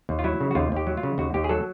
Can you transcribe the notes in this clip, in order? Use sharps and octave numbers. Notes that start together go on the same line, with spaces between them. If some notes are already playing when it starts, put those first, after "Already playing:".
D#2
F4
F#3 E4
C#3
F#4
D#2 F4
D#2 G4
F#3
F4
C#3
D#2 F#4
D#2 G4
G#4
F#3 A4